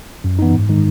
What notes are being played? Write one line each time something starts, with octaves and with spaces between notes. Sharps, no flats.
F#2
E3 B3 D#4
G#2
D#3 G#3 D#4